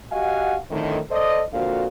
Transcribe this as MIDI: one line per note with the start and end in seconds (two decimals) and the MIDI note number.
0.12 0.55 66
0.12 0.55 67
0.12 0.55 75
0.12 0.55 77
0.12 0.55 78
0.12 0.55 80
0.71 0.98 41
0.71 0.98 45
0.71 0.98 50
0.71 0.98 51
1.11 1.41 69
1.11 1.41 72
1.11 1.41 74
1.11 1.41 75
1.53 1.86 41
1.53 1.86 46
1.53 1.86 50
1.53 1.86 66
1.53 1.86 72
1.53 1.86 77